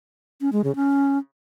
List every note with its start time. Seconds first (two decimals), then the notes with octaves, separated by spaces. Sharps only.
0.41 C#4
0.52 G#3
0.64 C#3
0.76 C#4